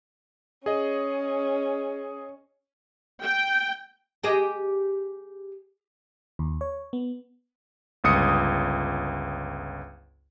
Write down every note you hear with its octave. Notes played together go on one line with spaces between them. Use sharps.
C#4 G#4 D#5
G5
G4 G#4 D#5
D#2
C#5
B3
G1 C#2 D#6 C#7